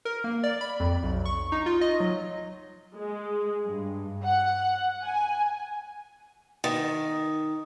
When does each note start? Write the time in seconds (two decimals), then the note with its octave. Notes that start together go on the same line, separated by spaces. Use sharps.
0.05 A#4
0.24 A#3
0.43 D5
0.61 B5
0.80 F2
1.03 B1
1.25 C#6
1.52 D#4
1.66 F4
1.81 D#5
2.00 F#3
2.95 G#3
3.65 G2
4.25 F#5
5.05 G#5
6.64 D#3